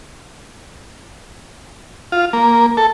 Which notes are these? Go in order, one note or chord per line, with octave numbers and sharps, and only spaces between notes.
F4
A#3
A4